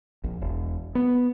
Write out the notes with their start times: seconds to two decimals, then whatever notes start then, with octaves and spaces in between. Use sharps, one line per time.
0.24 A#1
0.41 E1
0.95 B3